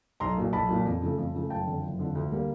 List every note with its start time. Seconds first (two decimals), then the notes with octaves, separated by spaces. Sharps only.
0.20 B1 A#5 C6
0.37 A#2 F#3
0.53 B1 A5 B5
0.69 A#2 F#3
0.86 F2
1.02 C#3 F3 A3
1.18 F2
1.34 C#3 F3 A3
1.50 F#1 G5 A5
1.67 F2 D3 F3
1.83 F#1
1.99 F2 D3 F3
2.15 D2
2.31 D3 G3 A#3